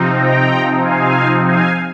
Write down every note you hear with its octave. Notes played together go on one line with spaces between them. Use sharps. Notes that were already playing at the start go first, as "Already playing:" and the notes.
Already playing: C3 F3 C4 D#4
G5 A#5
F5 G#5
F5 G#5